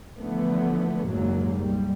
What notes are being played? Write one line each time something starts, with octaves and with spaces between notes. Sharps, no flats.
D3 E3 F3 A3 B3
F#1 D#2 G#2 F#3 A#3
B1 G3